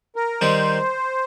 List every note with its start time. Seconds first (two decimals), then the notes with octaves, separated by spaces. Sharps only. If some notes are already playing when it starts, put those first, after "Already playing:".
0.16 A#4
0.41 D#3 G3 D#4 G4 C5